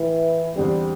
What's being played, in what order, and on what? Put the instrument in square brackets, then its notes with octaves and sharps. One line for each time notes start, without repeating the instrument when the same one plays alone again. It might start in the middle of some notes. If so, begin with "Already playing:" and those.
Already playing: [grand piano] A2 [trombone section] E3
[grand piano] E2 D3 C4 [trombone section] G3